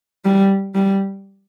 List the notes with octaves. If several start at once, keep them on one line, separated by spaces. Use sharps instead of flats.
G3
G3